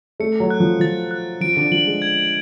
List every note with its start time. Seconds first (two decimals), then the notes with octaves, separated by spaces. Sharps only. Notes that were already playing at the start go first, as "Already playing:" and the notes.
0.20 A3 C#7
0.40 F#3
0.50 F#6
0.60 F3
0.80 F3 A6
1.11 F#6
1.41 F3 D7
1.57 D3
1.71 F3 F#7
1.86 G#3
2.02 G#6